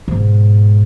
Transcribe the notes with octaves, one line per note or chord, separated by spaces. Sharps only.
G#2 B2